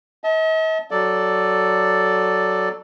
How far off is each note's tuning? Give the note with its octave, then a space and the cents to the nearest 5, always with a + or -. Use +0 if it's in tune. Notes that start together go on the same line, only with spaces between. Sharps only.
D#5 +45 A5 -10
F#3 +10 A4 +0 D5 +0